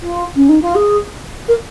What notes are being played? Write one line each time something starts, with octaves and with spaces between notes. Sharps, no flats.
F4
C#4
D#4
F4
G#4
A#4